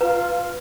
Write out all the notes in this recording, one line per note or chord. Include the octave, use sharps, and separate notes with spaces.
F4 B4